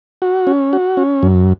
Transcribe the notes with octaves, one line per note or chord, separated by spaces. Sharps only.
F#4
C#4
F#4
C#4
F#2